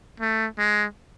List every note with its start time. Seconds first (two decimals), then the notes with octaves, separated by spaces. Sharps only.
0.20 A3
0.59 G#3